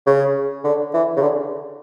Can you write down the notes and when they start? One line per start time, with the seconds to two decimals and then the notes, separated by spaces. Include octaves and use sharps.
0.07 C#3
0.64 D3
0.94 E3
1.16 C#3
1.22 D3